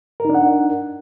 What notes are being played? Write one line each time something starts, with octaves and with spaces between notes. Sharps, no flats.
D4 D#4 A#4 F#5